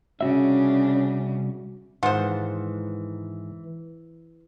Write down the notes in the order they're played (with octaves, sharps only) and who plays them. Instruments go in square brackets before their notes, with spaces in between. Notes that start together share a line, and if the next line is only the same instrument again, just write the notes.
[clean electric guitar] C2 F#4 E5 [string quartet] C#3 D4 [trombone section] C#4
[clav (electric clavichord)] G#2 D#3 [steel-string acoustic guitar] E3 [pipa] F4 C5 [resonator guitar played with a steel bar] F#5